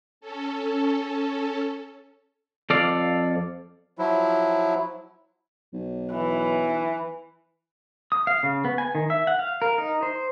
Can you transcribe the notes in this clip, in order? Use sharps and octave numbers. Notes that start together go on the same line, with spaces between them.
C#4 A4
F2 A4 D5 F5
F3 F#3 E4
B1
E3
D#6
F5
C#3
B3
G#5
D#3
E5
F#5
F5
A#4
D#4
C5